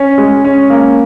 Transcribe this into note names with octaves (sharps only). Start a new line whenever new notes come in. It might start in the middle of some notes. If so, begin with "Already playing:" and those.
Already playing: C#4
G#3
C#4
A#3